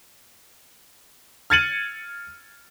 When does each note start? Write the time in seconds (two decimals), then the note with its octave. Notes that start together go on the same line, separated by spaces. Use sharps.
1.50 F6 G#6 A6 C#7 D#7 F#7